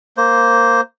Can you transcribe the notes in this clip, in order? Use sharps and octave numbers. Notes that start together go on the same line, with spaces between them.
A#3 C5